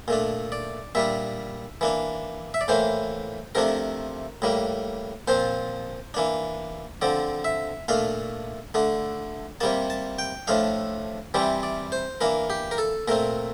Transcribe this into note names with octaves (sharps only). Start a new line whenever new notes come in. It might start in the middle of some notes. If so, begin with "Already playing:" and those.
A#2 A3 D4
D5
A#2 G3 D4 E5
E3 A#3 D4
E5
D5
A2 E3 A#3 C5
C3 F3 A3 D4 A#4
A2 G3 A#3
A#2 F3 C4 C5
E3 A#3 D4
D3 F3 C4 D5
E5
A#2 A3 D4 F5
D3 A3 D4
C3 G3 A#3 A5
A5
G5
A2 F3 A3 D4 F5
C3 E3 G3 C4 D5
D5
C5
E3 A#3 D4 A#4
G4
A#4
A4
A#2 A3 C4 A#4